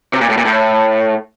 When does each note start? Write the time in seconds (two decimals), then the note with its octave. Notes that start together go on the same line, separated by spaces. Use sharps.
0.14 C3
0.21 A#2
0.30 A2
0.37 A#2
0.45 A2